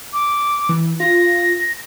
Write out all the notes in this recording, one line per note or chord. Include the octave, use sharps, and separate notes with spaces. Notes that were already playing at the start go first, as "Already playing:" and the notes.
D6
E3
F4 A#6